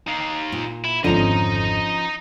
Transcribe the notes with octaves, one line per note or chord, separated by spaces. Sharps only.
D#4 F5
A#2
E4
G#1 F2 D3 F3 C#4 D#5 A#5